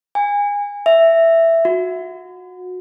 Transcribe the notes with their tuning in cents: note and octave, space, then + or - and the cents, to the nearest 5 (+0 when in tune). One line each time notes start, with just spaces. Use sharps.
G#5 -25
E5 +5
F#4 -25